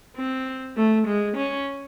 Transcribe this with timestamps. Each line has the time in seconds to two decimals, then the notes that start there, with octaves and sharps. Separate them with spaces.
0.16 C4
0.77 A3
1.07 G#3
1.36 C#4